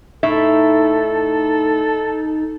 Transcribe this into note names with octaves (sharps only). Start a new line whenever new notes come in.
A2 D#4 A4 E5